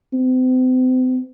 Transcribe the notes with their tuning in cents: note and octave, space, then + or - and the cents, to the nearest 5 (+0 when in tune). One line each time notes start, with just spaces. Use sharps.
C4 -40